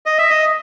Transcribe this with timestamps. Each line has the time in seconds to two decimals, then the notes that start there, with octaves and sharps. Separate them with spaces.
0.06 D#5
0.18 E5
0.30 D#5